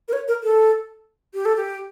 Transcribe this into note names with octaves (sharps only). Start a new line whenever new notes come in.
A#4
C#5
A#4
A4
G4
A4
G4